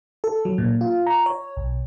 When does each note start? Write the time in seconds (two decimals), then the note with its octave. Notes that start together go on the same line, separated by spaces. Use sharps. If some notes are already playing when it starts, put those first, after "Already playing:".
0.24 A4
0.45 F#3
0.58 A#2
0.81 F4
1.07 A#5
1.26 C#5
1.57 B1